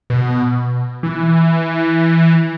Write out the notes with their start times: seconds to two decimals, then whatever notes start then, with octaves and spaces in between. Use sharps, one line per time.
0.10 B2
1.03 E3